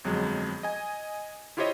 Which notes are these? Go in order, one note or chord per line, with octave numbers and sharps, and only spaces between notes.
G1 F2 F#3 G#3
D#5 G#5
E4 F4 G4 C5 C#5 D#5